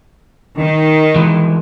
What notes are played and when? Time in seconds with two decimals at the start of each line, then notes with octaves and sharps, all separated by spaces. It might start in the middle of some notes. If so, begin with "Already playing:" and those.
0.59 D#3
1.16 E3 F3 G#3